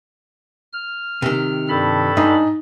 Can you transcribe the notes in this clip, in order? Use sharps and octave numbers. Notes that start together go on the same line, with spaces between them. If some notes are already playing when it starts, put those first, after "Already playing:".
F6
C3 D#3
G2 A4 B5
G#2 D#4